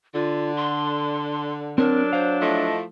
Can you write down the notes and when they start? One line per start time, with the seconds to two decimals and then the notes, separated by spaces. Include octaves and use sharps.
0.14 D3 F4
0.57 C6
1.78 F#3 C4 D4 A#4
2.13 C5 F5
2.41 F3 A3 E4 D#5